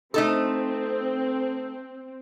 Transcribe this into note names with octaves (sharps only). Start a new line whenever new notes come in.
A3 C4 D#4 A4